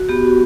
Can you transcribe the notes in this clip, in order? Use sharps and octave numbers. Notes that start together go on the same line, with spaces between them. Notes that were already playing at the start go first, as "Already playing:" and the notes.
Already playing: F#4
B3 G4
F#4